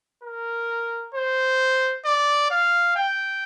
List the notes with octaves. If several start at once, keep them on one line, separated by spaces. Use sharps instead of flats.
A#4
C5
D5
F5
G5